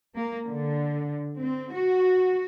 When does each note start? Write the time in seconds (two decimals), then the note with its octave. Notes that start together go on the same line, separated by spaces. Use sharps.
0.15 A#3
0.46 D3
1.39 C4
1.73 F#4